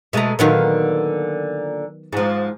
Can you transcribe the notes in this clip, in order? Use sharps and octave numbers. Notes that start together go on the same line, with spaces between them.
B2 G#3 A3 E5 A#5
A#2 D3 D#3 F#3 B3 F4
G#2 F3